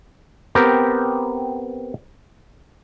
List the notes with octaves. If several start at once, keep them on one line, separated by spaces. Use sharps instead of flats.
B3 C4 G4 A#4